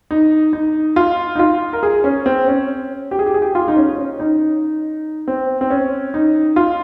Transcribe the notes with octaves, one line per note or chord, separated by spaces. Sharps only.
D#4
D#4
F4
D#4
F4
A#4
G#4
C#4
C4
C#4
G4
G#4
G4
G#4
G4
F4
D#4
C#4
C#4
D#4
C4
C4
C#4
D#4
F4